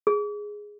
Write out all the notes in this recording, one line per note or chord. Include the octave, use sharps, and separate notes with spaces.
G#4